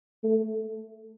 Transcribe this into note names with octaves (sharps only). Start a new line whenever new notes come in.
A3